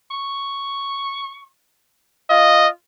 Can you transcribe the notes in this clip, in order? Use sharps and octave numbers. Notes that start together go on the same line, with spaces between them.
C#6
F4 D#5